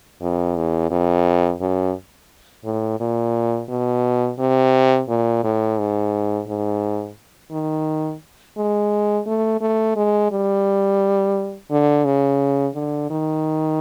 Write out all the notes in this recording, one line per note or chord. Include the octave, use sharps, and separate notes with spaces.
F2
E2
F2
F#2
A2
A#2
B2
C3
A#2
A2
G#2
G#2
D#3
G#3
A3
A3
G#3
G3
D3
C#3
D3
D#3